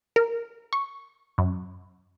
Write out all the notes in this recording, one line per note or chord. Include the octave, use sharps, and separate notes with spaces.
A#4
C#6
F#2